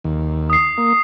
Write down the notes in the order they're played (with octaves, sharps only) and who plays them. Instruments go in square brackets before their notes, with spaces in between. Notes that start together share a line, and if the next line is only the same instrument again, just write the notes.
[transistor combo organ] D#2
[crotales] D#6 C7
[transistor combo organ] A#3